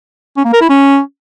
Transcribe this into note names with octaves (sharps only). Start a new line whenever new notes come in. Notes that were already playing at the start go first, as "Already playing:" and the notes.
C#4
A#3
A#4
E4
C#4